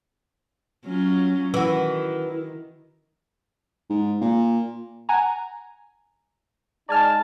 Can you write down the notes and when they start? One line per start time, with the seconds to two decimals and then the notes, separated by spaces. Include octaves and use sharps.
0.86 F#3 C#4 F4
1.54 D#3 E3 F#4
3.90 G#2
4.21 A#2
5.09 F#5 G#5 A#5
6.89 G#3 D#4 D5 G#5 A5 F6